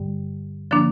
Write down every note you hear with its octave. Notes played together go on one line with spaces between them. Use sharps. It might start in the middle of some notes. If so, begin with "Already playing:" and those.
Already playing: G2 D3 G3
D3 F3 A#3 D4